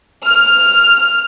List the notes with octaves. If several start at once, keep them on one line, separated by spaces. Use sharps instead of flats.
F6